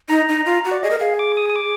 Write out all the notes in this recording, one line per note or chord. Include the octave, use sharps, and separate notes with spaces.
D#4 A#5
D#4
F4
F#4
D5
G#4 D#5
A#4
G#4 F5
D6
D#6
D#6
D6